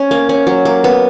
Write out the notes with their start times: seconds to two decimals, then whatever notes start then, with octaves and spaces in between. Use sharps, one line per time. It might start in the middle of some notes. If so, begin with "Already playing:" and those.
Already playing: C#4
0.11 A#3
0.29 C#4
0.47 F#3
0.65 A#3
0.84 B3